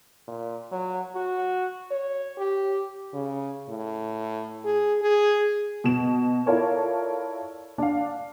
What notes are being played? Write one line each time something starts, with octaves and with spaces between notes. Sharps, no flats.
A#2
F#3
F#4
C#5
G4
C#3
A2
G#4
G#4
B2 E7
E4 F4 A4 A#4 C#5 D5
D4 F5